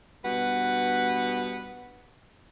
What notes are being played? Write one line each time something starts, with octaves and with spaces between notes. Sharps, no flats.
G2 B2 B4 F#5